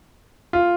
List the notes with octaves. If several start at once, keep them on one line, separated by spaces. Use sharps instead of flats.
F4